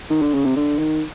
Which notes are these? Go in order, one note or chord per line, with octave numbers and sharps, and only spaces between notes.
D#3
D3
C#3
C3
D3
D#3